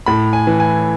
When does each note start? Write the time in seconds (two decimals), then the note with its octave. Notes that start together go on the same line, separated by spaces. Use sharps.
0.06 A2 B5
0.33 G#5
0.47 E3
0.60 G#5